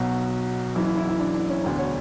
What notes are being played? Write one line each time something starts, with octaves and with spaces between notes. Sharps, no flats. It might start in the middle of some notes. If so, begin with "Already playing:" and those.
Already playing: B1 B2 F#3 F#4
F#1 F#2 E3 E4
E4
E4
E4
D4
D4
C#4
E1 D2 D3 D4
C#5